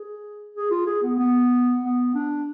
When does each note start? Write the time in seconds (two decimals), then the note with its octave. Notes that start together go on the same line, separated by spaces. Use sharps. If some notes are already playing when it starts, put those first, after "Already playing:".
Already playing: G#4
0.55 G#4
0.71 F4
0.86 G#4
1.03 B3
1.19 B3
1.83 B3
2.15 D4